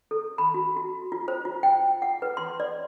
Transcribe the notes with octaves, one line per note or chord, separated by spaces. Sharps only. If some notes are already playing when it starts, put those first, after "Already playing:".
A4
B5
F#4
F#4
F4
C5
F4
G5
F#5
B4
C6
D5